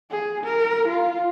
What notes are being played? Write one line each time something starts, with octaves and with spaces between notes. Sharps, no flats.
G#4
A#4
F4